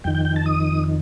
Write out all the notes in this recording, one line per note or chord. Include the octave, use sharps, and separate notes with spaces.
F2 D#3 G5
G5
G5
A5
D#6